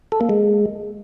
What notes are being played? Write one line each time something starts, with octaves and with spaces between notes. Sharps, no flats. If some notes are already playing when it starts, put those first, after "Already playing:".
A4
A#3
G#3